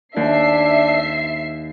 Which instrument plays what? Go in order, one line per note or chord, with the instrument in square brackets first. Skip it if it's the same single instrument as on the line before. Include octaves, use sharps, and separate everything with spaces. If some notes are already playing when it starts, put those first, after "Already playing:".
[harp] D#2 [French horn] D4 [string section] E5 C7